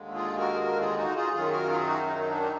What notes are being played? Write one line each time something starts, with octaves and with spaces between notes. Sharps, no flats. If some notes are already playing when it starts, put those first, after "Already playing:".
Already playing: D#2 D3 G#3
F4 G#4
F#4 A#4
G#4
F#4 A#4
F4 G#4
D#4 F#4
F4 G#4
F#2 D#3 F#3 F4 G#4
F#4 A#4
F4 G#4
F4
D#4 F#4
D#4
D#4
D4
D#4